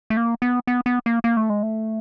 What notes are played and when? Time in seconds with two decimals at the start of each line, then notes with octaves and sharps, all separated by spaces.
0.10 A3
0.17 A#3
0.42 B3
0.67 B3
0.86 B3
1.06 A#3
1.24 A#3
1.37 A3
1.50 G#3
1.63 A3